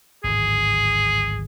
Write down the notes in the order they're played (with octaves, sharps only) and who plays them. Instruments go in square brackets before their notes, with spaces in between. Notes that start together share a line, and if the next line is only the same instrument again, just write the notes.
[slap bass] D1 G#1 [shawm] G#4